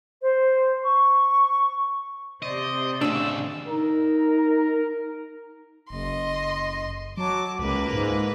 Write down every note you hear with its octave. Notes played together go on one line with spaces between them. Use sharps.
C5
C#6
C3 C5 D5 D#5
D#2 A2 C#3 D4 E6
D#4 A#4
F#1 D#5 C6
F#3 A5 D6
C#2 A#3 B4
G#2